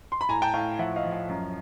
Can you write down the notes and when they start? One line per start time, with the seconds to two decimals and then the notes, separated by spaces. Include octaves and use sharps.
0.12 C6
0.21 B5
0.29 A2 G#5 A#5
0.42 G5 A5
0.54 A2 F5 G5
0.79 F3 E5 F#5
0.96 D#5 F5
1.05 F3
1.12 D#5 F5
1.29 F#2